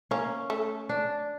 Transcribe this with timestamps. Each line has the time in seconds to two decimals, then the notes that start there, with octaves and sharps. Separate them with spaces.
0.11 A#3 C#4
0.50 A3
0.89 D4